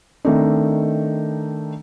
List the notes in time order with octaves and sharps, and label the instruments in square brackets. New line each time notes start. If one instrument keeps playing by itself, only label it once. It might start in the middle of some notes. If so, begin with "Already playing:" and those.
[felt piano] D#3 A3 C4 D4 D#4